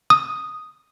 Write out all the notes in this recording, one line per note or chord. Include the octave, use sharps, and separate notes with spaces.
D#6